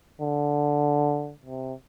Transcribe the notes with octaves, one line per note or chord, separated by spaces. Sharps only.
D3
C3